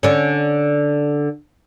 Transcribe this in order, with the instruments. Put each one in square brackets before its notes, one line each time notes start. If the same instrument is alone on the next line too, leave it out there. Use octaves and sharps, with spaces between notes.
[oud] D3 C#4